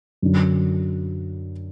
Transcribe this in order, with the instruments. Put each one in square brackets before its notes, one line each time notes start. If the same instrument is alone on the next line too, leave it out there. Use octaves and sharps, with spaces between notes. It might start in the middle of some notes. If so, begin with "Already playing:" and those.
[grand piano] F#2 D3